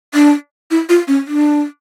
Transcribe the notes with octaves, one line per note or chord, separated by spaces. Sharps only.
D4
E4
F4
C#4
D4